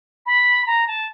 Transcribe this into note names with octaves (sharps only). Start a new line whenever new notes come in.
B5
A#5
A5